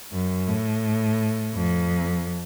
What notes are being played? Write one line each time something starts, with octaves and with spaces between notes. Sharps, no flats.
F#2
A2
F2